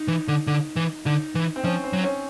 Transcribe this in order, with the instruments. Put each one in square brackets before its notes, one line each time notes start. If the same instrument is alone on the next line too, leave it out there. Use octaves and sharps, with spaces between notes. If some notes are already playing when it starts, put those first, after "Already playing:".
Already playing: [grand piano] D#4
[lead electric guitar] E3
D3
D3
E3
[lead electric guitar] D3 [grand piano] D#4
[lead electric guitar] E3
[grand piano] C4
[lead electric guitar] F3 [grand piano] C#4
[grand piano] C4
[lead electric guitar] F#3
[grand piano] C#4